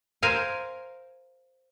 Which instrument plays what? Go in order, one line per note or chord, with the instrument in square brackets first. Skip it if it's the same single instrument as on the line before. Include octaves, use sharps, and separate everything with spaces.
[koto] A#4 C5 F5 G#5